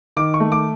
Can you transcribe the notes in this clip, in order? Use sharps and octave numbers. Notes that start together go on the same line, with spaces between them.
D#3 D6
C#6
A3
D6